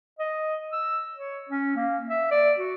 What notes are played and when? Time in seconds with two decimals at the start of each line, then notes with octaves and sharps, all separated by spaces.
0.19 D#5
0.73 E6
1.15 C#5
1.49 C#4
1.76 A#3
2.10 E5
2.31 D5
2.58 F#4